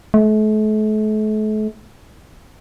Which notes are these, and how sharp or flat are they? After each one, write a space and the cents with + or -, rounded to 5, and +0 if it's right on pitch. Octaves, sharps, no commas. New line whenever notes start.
A3 -40